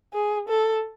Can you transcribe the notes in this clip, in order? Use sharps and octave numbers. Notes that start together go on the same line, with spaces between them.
G#4
A4